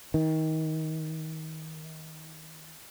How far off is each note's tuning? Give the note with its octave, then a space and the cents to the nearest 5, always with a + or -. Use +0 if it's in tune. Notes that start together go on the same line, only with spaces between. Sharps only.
D#3 +25